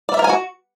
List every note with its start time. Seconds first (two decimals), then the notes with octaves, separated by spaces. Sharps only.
0.09 D5
0.14 E5
0.19 A#4
0.24 G#5
0.29 F#4